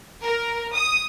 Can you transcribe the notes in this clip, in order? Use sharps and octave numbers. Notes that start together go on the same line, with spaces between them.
A#4
D#6